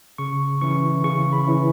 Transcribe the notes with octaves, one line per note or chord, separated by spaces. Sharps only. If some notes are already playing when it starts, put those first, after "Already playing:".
C#3 C#6
E3 C#4 E4 C#6
C#3 C#6
B5
E3 C#4 E4